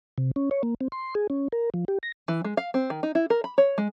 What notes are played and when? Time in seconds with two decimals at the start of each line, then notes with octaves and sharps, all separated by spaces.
0.18 C3
0.36 C#4
0.51 C#5
0.63 A#3
0.81 C4
0.92 C6
1.15 G#4
1.30 C#4
1.52 A#4
1.74 F3
1.88 G4
2.03 A#6
2.28 E3
2.44 G#3
2.57 F5
2.74 C4
2.90 D#3
3.03 D#4
3.15 E4
3.30 A#4
3.44 B5
3.58 C#5
3.78 G#3